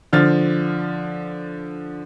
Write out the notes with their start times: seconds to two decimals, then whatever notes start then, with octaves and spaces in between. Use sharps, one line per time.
0.13 D3 F3 F6 A6